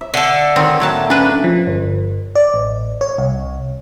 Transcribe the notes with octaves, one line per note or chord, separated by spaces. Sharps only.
E5
D3 A4
D#3 C4 F#4 C#5
A2 F#3 A3 A#3 A5
C#4 D4 B4
F3
G1
D5
A1
C#5
C2